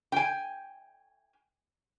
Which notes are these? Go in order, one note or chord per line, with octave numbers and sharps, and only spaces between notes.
G5 G#5